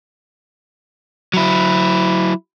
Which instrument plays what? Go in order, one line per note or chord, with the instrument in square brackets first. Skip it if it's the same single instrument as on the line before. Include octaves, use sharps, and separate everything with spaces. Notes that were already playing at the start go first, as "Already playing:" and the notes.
[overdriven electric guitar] F#3 E4